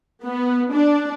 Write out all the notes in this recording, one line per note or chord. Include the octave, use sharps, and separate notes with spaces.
B3
D4